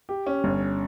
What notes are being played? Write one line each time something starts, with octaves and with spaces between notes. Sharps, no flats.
G4
C#4
G1